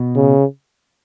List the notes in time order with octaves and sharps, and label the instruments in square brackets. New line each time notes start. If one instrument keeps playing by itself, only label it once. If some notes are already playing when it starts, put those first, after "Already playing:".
Already playing: [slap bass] B2
[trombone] C#3